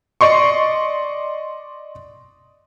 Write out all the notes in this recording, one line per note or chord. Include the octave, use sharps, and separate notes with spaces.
D5 D#5 C6 C#6